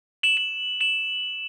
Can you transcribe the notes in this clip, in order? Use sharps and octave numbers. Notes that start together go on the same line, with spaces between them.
E7 F#7
E7 F#7
E7 F#7